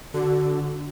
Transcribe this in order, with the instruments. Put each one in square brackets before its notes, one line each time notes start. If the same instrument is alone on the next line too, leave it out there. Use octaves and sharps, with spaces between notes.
[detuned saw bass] D3 [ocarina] F#4